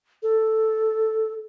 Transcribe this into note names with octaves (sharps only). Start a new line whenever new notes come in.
A4